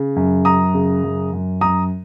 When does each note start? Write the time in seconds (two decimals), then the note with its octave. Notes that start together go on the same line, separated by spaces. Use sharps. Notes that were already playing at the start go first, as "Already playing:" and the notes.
Already playing: C#3
0.16 F#2
0.45 F#2 A#5 D#6
0.74 C#3
1.04 F#2
1.33 F#2
1.61 F#2 A#5 D#6